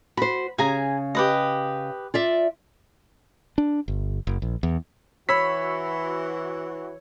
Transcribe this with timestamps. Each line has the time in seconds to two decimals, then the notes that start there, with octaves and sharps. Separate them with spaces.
0.17 F#4 C5 B5
0.58 C#3 G#4 G#5 A#5
1.15 G4 B4 D#5
2.14 F4 D5 E5
3.58 D4
3.88 G1
4.27 F#1
4.42 A#1
4.63 E2
5.29 E3 F#4 C#5 B5 E6 B6